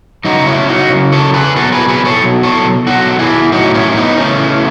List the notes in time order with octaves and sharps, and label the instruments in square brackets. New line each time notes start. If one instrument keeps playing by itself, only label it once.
[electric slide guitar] C#3 F#3 D#4 F#4
C#4 E4
D#4 F#4
C#3 F#3
A4 C#5
G#4 B4
B2 F#3 F#4 A4
G#4 B4
G#4 B4
A4 C#5
B2 F#3
A4 C#5
B2 F#3 F#4 A4
E4 G#4
A2 F#3 D#4 F#4
C#4 E4
B3 D#4
C#3 E3 A3 C#4